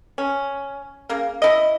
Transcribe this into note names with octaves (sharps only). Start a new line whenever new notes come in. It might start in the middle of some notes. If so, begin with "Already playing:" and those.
C#4
C#3 A#3
E4 D#5